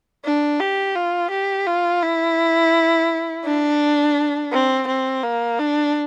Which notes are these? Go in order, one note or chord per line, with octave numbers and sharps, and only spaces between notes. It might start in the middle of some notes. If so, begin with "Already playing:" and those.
D4
G4
F4
G4
F4
E4
D4
C4
C4
A#3
D4